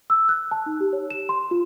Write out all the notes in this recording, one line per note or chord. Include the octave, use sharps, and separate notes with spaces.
E6
F#6
A5
D#4
G4
C#5
E7
C6
F4